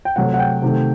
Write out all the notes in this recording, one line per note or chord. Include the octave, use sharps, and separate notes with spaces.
G5
C3 F#3 A3 F#5
F#5
G5
C3 D#3 A3